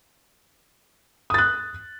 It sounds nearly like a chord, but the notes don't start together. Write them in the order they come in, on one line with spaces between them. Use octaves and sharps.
D#6 A6 F#6